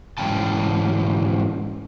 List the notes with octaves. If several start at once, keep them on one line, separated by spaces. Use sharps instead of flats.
G#2 E3 G#3 C#4 G5 A5